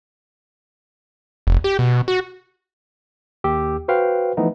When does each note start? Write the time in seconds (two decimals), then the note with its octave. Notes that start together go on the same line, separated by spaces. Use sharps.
1.47 F1
1.64 G4
1.79 B2
2.08 F#4
3.44 D#2 G4 E6
3.88 F#4 B4 C5 F5 G5
4.37 E3 F3 A3 B3 D#4